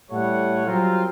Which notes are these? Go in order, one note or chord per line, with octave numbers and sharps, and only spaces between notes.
A2 G3 A3 C#5 F#5
F#3 G3 C4 F4 A#4